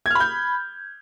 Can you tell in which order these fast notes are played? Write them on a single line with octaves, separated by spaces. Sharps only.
G#6 F6 B5 G6